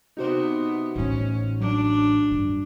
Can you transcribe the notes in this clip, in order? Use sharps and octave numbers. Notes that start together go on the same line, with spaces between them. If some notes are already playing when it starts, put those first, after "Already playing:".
C3 B3 D#4 F#4 C5
A1 A3 C#4
F#3 D4
G2